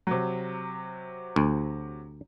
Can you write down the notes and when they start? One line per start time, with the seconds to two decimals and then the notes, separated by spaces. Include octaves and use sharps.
0.07 C3 F#3
1.36 D2